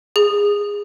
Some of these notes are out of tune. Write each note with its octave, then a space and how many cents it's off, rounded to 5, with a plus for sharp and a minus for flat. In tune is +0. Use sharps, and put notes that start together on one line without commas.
G#4 -20